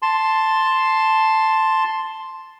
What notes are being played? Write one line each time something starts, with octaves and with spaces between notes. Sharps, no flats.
A5 C6